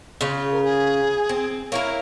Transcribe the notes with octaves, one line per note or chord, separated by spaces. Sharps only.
C#3 F4
A#4
G#4
C4
A#3 E4 A#4 C#5